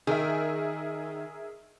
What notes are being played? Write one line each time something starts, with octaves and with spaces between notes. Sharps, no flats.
D#3 G#4 A#4 E5